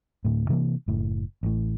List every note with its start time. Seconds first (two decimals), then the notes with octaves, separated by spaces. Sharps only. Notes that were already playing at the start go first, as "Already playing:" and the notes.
0.25 D2 A2
0.49 C3 E3 A3 A#3
0.88 F#1 A2
1.43 A1 A2